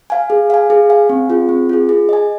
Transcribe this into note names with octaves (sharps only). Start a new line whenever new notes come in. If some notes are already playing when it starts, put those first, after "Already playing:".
F5 G#5
G#4
F5 G#5
G#4
F5 G#5
C4
F4 G#4
C4
F4 G#4
G#4
D#5 G#5